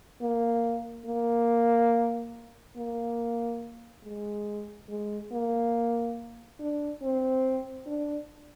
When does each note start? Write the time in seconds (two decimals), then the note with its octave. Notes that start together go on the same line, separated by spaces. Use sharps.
0.21 A#3
1.06 A#3
2.77 A#3
4.04 G#3
4.89 G#3
5.32 A#3
6.60 D4
7.02 C4
7.87 D4